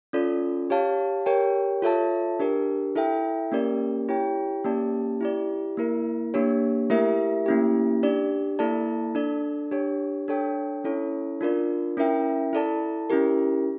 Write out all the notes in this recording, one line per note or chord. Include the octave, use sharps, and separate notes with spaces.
C#4 F4 A4 D5
G4 C#5 F5 A5
G4 A#4 C#5 G5
F4 A4 C#5 E5 A5
D4 G4 A#4
E4 A4 E5 G5
A#3 C#4 G4 A#4 D5
E4 G4 C#5 G5
A#3 C#4 G4 D5 A5
E4 G4 D5
A#3 E4 A#4
A#3 D4 G4 C#5
A3 E4 G4 A#4 E5
A#3 C#4 E4 G4
D4 G4 D5
A#3 E4 A4 D5 A5
D4 A4 D5
D4 G4 C#5
D4 A4 C#5 G5
C#4 E4 A4 C#5
D4 F4 A#4 D5
C#4 E4 A#4 E5 G5
E4 A4 D5 A5
C#4 E4 G4 A#4